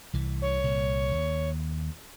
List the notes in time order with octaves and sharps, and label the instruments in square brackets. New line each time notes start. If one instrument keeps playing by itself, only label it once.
[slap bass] C2 E3
[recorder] C#5
[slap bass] C2 A#2
D#2